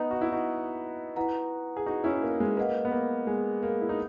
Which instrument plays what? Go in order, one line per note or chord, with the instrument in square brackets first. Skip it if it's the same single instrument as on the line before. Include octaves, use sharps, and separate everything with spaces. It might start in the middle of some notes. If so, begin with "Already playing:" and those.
Already playing: [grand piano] B3 D#4 [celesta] B4 D#5 A#5
[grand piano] F#4
E4
D#4 F#4
[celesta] E4 B4 F#5 A#5
[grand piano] G#4
D#4 F#4
C#4 E4
A#3
G#3
[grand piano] A#3 [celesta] B4 D#5 F#5
[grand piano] B3
A#3
G#3
A#3
E4
D#4